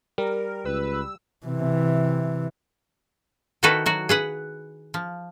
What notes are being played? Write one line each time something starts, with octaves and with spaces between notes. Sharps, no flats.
G3 A#4
C#2 B4 E6
C3 E3
D#3 D#4 E4 F#4 A4 B4
F#3 F#4
G#4 B4 F#5
F3